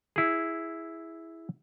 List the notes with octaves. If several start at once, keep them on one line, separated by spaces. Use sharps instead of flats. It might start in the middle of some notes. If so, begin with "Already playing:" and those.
E4 G#4